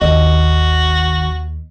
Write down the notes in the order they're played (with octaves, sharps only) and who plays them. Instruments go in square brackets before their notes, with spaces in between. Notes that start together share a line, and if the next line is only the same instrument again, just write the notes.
[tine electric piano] G1 D#3 [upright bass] D#2 [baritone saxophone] F#4 [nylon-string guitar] D#5